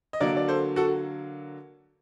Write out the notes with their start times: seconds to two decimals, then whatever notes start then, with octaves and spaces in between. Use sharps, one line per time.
0.13 D#5
0.20 D3 F#3 A#3 A#4 D5
0.37 D5
0.48 A4 C5
0.76 F#4 A4